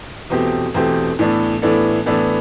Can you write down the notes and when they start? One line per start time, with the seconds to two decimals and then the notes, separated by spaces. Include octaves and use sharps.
0.30 E2 B2 A3 C4 G4
0.74 E2 B2 A3 C4 G4
1.19 A2 E3 B3 D4 A4
1.62 A2 E3 B3 D4 A4
2.06 A2 E3 B3 D4 A4